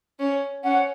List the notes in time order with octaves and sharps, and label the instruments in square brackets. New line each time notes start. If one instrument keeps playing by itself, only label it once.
[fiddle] C#4 [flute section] C#5
[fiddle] C#4 [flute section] F#5